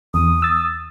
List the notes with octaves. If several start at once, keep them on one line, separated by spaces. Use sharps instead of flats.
E2 D#6
E6 A6